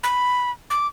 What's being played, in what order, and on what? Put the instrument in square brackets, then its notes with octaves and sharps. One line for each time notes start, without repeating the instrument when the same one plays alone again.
[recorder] B5
D6